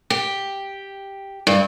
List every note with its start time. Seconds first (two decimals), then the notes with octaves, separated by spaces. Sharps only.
0.10 G4
1.47 G2